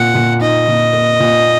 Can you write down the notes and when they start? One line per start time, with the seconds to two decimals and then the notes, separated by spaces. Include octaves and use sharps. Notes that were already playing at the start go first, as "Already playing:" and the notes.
Already playing: A#2 A#3 F#5
0.14 A#2
0.40 D#4 D#5
0.68 A#2
0.93 A#3
1.20 A#2